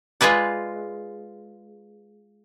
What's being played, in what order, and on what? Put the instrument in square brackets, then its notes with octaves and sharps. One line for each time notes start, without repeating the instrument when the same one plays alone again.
[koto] G#3 F4 G#4 B4 D5